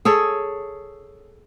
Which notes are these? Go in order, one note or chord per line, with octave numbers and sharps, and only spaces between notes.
G#4 A4 C#5